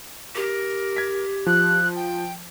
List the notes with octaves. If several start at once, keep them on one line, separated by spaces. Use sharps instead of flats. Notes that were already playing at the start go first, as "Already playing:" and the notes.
G4 A#4
G#6 B6
F3 F#6
G5